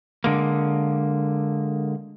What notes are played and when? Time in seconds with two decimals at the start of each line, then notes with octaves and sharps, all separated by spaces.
0.24 D3 G#3 A#3